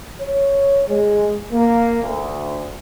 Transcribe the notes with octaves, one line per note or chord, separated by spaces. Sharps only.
C#5
G#3
A#3
D2